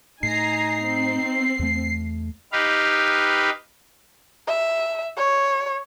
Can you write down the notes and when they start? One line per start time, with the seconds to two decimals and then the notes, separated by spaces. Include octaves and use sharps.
0.23 A2 D#4 G#5 A#5 C7
0.83 C4
1.59 E2 A3
2.52 D#4 G4 B4 F5
4.47 E5
5.17 C#5